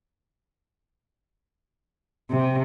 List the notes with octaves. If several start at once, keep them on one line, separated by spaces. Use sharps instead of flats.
C3